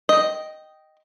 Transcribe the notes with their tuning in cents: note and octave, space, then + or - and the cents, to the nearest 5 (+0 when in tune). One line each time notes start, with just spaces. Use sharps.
D#5 +0 G5 -10